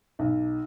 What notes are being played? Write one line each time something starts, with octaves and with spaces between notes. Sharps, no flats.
B1